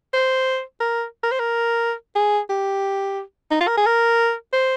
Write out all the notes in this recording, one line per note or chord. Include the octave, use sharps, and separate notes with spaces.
C5
A#4
A#4
C5
A#4
G#4
G4
D#4
F4
A#4
G#4
A#4
C5